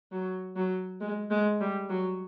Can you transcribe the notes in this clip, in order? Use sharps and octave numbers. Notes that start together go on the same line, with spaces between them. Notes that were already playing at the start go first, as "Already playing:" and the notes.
F#3
F#3
G#3
G#3
G3
F#3